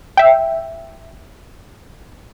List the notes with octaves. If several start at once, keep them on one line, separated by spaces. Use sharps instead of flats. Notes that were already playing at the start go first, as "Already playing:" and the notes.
E5 G5